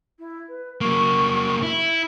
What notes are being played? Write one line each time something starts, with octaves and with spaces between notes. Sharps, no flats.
E4
B4
F#3 A#3 C#6
E4 E5